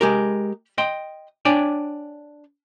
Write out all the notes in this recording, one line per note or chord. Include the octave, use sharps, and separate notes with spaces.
G#3 G4 A#4
D#5 G5 C6
D4 C#5 D5 G5 G#5